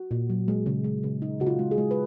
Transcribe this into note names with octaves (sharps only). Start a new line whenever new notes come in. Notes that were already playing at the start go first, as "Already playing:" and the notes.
Already playing: F#4
A#2
F#3
G#3
C#3
G#3
C#3
D#4
C#3 F#4
F4
G#3
G#4
G#3
B4